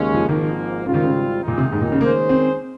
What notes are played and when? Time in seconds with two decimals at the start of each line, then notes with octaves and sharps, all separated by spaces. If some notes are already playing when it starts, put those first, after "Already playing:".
Already playing: D#2 C#3 G#3 C#4
0.14 F3
0.28 G#1 G#2 D#3 F3 A#3
0.86 G#1 G#2 C#3 G3 C4 F4
0.94 D#3
1.03 C#3
1.43 D#2 A#2 D#3 G#3 D#4
1.58 C3
1.72 G#2
1.81 A#2
1.92 C#3
2.01 D#3 G#3 A#3 C#4 G#4 C5
2.29 C4